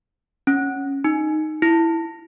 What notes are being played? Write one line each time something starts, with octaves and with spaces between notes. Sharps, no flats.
C#4
D#4
E4